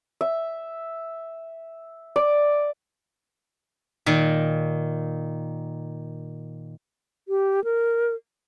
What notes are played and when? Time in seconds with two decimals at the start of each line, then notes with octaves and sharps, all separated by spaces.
0.21 E5
2.16 D5
4.06 A#2 D#3
7.28 G4
7.64 A#4